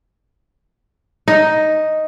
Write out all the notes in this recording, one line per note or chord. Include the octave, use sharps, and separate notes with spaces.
D#4